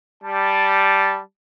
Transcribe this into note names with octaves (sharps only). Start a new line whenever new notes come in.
G3 A5